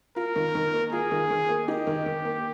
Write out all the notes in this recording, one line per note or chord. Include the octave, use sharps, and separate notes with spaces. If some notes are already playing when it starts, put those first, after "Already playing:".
F4 A#4
D#3
D#3
A#3
F4 G#4
D#3
D#3
A#3
D#4 G4
D#3
D#3
A#3